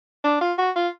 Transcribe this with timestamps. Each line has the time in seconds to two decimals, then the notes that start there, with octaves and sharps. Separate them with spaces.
0.24 D4
0.41 F4
0.58 F#4
0.76 F4